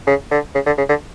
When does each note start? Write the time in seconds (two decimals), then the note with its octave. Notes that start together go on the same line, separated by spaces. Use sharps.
0.07 C#3
0.31 D3
0.55 C#3
0.66 D3
0.78 C#3
0.89 D3